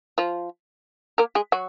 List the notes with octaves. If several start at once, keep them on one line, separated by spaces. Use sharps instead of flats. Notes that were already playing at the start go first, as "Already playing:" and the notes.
F3 F4
A#3 A#4
G#3 G#4
F#3 F#4